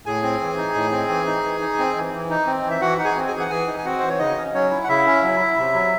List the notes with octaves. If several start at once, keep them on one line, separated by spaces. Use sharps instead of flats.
A2 G#4 G#5
C4
E3
D#4
A2
C4
E3
D#4
E3
D#4
C4
E3
E3
D#4
C4
E3
E5
E3 F#4 F#5
D#4 F#5
G#4 G#5
C4
G#4 G#5
E3
F#5
E3 G#4 G#5
D#4
G#5
C4 F#4 F#5
E3 C5
C#5
C#3 D#4 D#5
C#4
F#3 C#4 C#5
E4
F#5
C#3 E4 E5
C#4
F#3
E4
C3
F#3